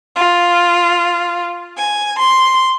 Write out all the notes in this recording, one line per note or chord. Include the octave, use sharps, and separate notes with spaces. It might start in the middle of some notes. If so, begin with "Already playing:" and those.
F4
G#5
C6